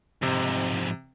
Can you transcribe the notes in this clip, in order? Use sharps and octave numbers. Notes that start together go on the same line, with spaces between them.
F2 G#2 C3